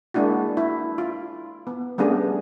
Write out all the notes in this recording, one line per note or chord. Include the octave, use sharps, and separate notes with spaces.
G#3 A#3 D4 E4 F#4
E4
F4
B3
G3 A3 B3 C#4 D4 G#4